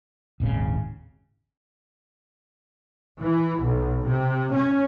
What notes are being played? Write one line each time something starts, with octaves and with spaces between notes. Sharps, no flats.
D#1 G#1 C#3
E3
B1
C3
C#4